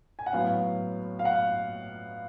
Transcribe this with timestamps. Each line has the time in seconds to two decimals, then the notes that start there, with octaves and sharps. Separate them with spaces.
0.19 G#5
0.26 F#5
0.33 A2 F#3 B3 F5
1.19 F5
1.25 F#5